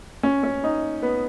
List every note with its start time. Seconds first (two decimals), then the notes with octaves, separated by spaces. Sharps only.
0.23 C#4
0.43 C#4
0.64 D#4
1.02 B3